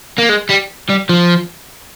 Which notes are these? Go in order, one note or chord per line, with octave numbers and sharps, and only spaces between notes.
A#3
G#3
G3
G3
F3